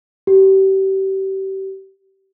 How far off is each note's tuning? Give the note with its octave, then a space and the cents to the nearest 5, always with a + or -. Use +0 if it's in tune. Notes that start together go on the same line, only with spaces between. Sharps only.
G4 -30